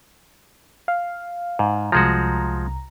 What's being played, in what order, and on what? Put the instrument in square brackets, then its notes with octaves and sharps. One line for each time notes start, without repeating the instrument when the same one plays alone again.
[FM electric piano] F5
[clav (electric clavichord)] G#2
[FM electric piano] C2 A#5 [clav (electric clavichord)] F3 G#3 F#4